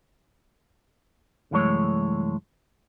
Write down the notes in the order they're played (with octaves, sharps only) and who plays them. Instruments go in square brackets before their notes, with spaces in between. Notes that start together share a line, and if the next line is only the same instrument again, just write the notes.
[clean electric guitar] C2 F#2 E3 G#3 A3 C#5